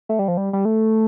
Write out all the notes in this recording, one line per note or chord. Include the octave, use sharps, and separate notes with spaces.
A3
G3
F3
G3
G3
A3